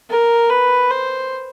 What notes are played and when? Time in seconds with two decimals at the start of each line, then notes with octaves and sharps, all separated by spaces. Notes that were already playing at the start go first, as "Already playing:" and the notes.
0.10 A#4
0.50 B4
0.91 C5